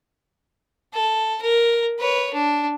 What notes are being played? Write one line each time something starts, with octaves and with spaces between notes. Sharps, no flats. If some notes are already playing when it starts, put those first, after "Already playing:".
A4
A#4
B4 C#5
D4